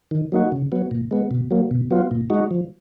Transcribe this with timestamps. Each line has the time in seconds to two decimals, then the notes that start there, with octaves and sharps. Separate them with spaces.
0.11 D#3
0.32 F#3 A#3 D#4 F#4
0.52 C#3
0.72 F#3 B3
0.91 A#2
1.11 G#3 B3
1.31 B2
1.51 F#3 A#3
1.71 B2
1.91 F#3 B3 F4
2.11 A#2
2.30 G#3 D#4 F#4
2.51 F3